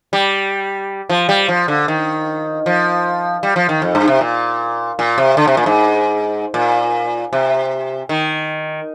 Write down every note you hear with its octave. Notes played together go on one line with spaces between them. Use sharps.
G3
F3
G3
F3
D3
D#3
F3
G3
F3
D#3
F2
G2
C3
A#2
A#2
C3
D3
C3
A#2
G#2
A#2
C3
D#3